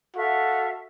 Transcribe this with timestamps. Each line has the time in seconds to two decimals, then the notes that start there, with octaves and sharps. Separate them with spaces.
0.15 F#4 A4 E5 F5